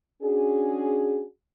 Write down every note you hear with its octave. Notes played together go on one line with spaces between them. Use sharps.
C#4 D4 F#4 G#4